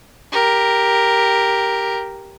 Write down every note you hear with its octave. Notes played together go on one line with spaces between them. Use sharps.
G4 A#4